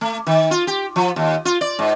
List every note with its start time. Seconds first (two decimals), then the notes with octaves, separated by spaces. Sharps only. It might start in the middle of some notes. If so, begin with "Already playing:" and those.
0.01 A3
0.27 D#3
0.51 F4
0.67 G4
0.96 F3
1.16 D#2
1.45 F4
1.61 D5
1.79 G#2